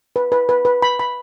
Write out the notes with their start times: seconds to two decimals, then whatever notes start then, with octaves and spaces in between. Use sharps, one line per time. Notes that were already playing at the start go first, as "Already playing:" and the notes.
0.16 B4
0.32 B4
0.49 B4
0.65 B4
0.82 B5
0.99 B5